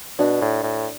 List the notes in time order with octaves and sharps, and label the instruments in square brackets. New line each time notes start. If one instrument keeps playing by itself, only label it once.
[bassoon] B2 [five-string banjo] D4 F#4
[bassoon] A2
A2